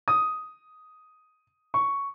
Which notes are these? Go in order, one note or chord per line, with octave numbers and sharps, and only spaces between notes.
D#6
C#6